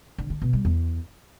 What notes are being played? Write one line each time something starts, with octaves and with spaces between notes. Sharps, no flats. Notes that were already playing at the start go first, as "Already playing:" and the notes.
D3
D3
B2
G3
E2